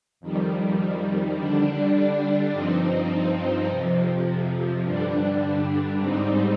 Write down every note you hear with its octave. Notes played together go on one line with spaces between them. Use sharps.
F2 D#3 G3
D3 G3 D4
G2 F3 C4 D#4
F2 C3 F3
G2 D3 G3 D4
G#2 G3 C4 D#4